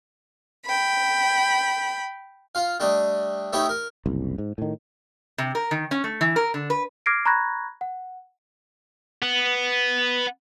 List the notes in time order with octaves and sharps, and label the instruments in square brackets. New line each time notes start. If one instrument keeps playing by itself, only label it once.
[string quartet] G5 B5
[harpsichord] F4 F5
G3 A3 D4 D#5
A3 D#4 E4 G4 C#5 D#5
A#4
[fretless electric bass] F#1 C2
G#2
A2 D#3
[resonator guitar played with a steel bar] C3
A#4
D#3
C#4
A3
E3
A#4
D3
B4
[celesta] D6 F6 G#6 A#6 C7 D7
A#5 B5 C#6 F#6 G#6 A#6
F#5
[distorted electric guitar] B3